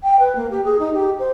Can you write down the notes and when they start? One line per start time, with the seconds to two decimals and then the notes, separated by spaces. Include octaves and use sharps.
0.03 G5
0.19 B4
0.35 A#3
0.50 G4
0.64 G#4
0.79 D#4
0.93 G4
1.19 C5